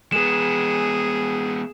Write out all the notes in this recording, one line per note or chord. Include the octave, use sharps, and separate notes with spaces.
G#3 B3 G#4 E7